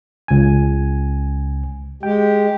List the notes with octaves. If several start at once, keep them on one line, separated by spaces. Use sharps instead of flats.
C#2 G#5
G#3 G4 G5